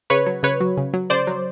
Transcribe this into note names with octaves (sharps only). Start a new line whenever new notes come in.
C#3 B4 C#5
F#3
C#3 B4 C#5
F#3
C#3
F#3
C#3 C5 D5
F#3